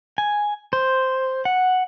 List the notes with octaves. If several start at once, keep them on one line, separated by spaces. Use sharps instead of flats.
G#5
C5
F#5